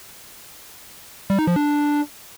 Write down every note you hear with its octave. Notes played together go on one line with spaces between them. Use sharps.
G3
D#4
F3
D4